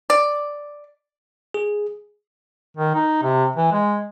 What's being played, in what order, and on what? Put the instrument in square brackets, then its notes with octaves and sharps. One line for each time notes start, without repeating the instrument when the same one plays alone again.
[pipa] D5
[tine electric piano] G#4
[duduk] D#3
D#4
C3
E3
G#3